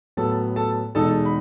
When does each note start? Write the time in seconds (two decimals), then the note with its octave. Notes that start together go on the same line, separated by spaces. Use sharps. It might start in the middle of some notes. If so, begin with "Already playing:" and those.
0.17 A2 F#3 B3 A4 A5
0.56 A4 A5
0.95 E2 B2 G#3 D#4 A4 A5
1.25 B5